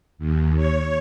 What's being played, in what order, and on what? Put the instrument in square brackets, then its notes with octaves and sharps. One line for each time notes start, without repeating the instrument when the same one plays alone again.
[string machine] D#2
C#5